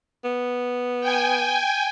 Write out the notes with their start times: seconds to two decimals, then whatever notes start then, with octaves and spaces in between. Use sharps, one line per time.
0.24 B3
1.00 G5 G#5